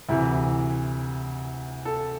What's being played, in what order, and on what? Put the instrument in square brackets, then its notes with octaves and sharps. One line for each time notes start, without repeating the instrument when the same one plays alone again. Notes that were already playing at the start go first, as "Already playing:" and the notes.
[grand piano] D2 C3 E3 E4
A4